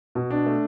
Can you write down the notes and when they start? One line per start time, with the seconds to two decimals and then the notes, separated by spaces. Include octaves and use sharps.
0.15 B2
0.31 D4
0.46 A3